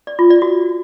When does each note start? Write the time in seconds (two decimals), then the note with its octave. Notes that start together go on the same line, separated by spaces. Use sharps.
0.07 D5
0.19 F4
0.30 D5
0.42 F#4